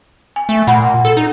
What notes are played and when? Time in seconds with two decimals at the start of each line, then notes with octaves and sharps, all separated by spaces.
0.36 G#5
0.49 A3
0.67 A#2 F#5 B5
1.05 A4
1.17 D#4